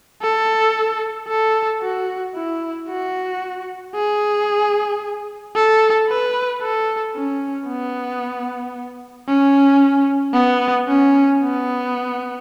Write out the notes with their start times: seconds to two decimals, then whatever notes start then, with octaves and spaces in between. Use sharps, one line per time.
0.22 A4
1.29 A4
1.82 F#4
2.35 E4
2.89 F#4
3.95 G#4
5.55 A4
6.09 B4
6.62 A4
7.15 C#4
7.68 B3
9.28 C#4
10.34 B3
10.89 C#4
11.42 B3